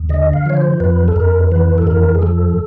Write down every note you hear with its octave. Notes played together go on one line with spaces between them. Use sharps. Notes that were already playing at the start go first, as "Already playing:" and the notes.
Already playing: D#2
D3 D#5
F5
F3 C#5
C5
F2 B4
A4
F2 A#4
E3 B4
A4
F2 A#4
G#4
F3 A4